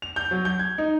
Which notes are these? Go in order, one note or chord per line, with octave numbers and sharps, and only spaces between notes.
F7
G6
F#3
G6
G#6
D#4